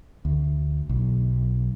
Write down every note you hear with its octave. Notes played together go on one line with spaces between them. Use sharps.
D2
B1